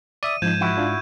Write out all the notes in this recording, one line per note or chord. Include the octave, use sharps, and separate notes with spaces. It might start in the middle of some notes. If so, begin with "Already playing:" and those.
D5 E5 D#6 D#7
G#2 F3 D#4 G6 G#6 E7
E4 F#4
D4 F4